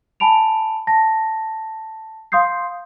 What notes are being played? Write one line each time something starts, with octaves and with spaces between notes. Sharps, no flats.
G#5 A5 B5 D7 F7
A5 A#6
F5 C6 D#6 G6 C7